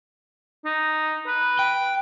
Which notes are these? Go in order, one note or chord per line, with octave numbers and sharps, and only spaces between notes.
D#4
B4
G5